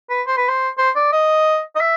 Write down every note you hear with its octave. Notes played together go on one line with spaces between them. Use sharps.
B4
C5
B4
C5
C5
D5
D#5
D#5
E5